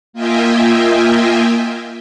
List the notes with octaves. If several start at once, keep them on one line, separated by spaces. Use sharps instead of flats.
A#3 F4 D#5 E5 G5 G#5